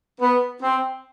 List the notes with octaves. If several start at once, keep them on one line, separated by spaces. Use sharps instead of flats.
B3
C4